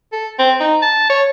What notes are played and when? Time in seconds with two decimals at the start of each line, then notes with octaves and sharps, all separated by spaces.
0.13 A4
0.39 C4
0.60 D#4
0.82 A5
1.10 C#5